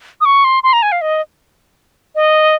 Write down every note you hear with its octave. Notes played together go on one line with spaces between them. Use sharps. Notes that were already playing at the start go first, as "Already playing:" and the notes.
D#6
C#6
C6
C6
A#5
G#5
F5
D#5
D#5